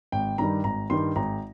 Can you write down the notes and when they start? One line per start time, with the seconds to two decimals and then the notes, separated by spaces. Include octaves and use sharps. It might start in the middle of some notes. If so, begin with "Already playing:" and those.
0.12 G#1 G5
0.38 G2 D#3 G3 A#5
0.64 G#1 A#5
0.90 G2 D#3 G3 C6
1.16 G#1 A#5